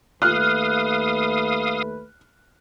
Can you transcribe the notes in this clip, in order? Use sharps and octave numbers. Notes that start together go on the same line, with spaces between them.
D#2 A3 B4 F5 D#6 F6 F#6